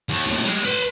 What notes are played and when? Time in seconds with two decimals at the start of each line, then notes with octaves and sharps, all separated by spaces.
0.09 D#2
0.26 D#2 A2
0.45 G3 G#3
0.65 B4 C6